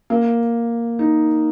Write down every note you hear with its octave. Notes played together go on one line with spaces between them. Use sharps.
A#3
D#4